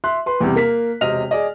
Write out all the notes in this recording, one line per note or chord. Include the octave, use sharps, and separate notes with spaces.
E5 C6 F#6
B4 C6
E2 C3 G3
A#3 A#4 B6
E1 C3 C4 D#5 F6 F7
G#4 D5 D#5